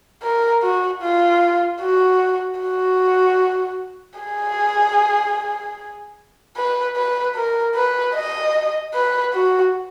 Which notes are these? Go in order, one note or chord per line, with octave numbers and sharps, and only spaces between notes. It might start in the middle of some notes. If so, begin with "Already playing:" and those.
A#4
F#4
F4
F#4
F#4
G#4
B4
B4
A#4
B4
D#5
B4
F#4